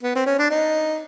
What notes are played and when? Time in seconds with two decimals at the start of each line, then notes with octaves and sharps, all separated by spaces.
0.03 B3
0.16 C4
0.26 C#4
0.39 D4
0.51 D#4